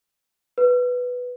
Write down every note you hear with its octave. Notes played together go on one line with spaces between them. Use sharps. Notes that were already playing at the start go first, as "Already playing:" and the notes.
B4